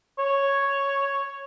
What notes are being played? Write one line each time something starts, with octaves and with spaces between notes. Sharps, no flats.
C#5